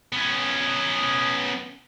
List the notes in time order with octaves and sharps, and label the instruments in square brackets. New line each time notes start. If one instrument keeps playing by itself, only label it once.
[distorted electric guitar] B3 C#4